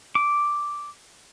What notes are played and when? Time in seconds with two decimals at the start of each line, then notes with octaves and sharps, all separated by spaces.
0.15 D6